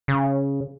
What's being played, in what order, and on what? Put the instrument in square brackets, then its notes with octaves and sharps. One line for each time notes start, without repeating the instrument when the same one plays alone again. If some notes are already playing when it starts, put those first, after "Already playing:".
[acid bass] C#3